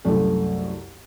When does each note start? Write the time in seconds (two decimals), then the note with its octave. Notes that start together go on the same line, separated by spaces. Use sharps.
0.05 C2 F#2 A3